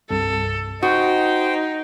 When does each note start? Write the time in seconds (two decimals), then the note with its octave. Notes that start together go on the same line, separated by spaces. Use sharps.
0.10 C2 G2 C3 A4
0.83 D#4 F#4 C5 G5 D#6